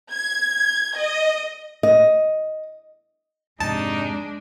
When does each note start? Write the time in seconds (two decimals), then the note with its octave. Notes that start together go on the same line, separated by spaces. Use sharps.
0.11 G#6
0.95 D#5
1.83 D#5
3.60 F2 G#2 C3 G#3 D4 D#4 A5